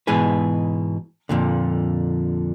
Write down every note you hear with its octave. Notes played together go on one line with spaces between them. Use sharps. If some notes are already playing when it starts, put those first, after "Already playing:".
G#2 B2 E3 G#3 G#4 B4
F2 A#2 D3